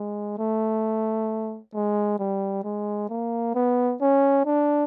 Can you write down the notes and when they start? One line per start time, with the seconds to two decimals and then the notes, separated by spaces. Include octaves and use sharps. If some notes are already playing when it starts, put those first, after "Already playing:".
Already playing: G#3
0.38 A3
1.74 G#3
2.19 G3
2.64 G#3
3.09 A#3
3.55 B3
4.01 C#4
4.46 D4